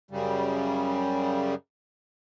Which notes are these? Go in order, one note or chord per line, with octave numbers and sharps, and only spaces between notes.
F#2 C#3 G3